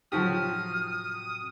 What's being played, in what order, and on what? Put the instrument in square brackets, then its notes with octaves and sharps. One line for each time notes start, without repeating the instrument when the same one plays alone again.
[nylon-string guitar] A2 C3 F#3 [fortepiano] F3 F#4 G4 [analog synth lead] D#6 [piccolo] F6